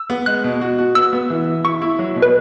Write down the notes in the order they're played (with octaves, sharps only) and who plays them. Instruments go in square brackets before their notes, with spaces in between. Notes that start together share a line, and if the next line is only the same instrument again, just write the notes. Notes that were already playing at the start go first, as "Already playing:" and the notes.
Already playing: [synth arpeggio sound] E6
[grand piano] B3
[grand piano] G#3 [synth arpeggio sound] F#6
[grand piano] B2
F#4
F#4
[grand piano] B3 [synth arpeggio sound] E6
[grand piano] B3
E3
E3
[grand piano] E4 [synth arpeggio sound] C#6
[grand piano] E4
F#3
B2
[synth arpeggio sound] B4